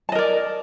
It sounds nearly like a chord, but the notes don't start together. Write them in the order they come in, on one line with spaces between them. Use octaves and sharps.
A5 D#5 A#4 D5